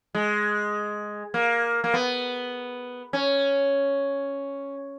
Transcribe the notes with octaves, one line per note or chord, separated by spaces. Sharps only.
G#3
A#3
A#3
B3
C#4